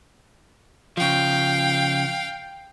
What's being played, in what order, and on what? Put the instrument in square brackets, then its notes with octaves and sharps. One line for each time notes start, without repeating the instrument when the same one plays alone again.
[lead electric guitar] C#3 F3 [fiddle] F5 G5